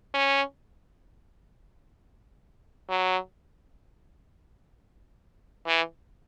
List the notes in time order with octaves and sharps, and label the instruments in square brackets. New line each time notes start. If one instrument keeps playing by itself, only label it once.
[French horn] C#4
F#3
E3